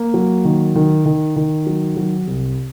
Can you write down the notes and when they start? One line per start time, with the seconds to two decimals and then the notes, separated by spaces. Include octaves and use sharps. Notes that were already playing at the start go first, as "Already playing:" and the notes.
Already playing: A#3
0.14 F#3
0.45 D#3
0.76 D#3
1.06 D#3
1.36 D#3
1.67 F#3
1.97 F#3
2.27 C2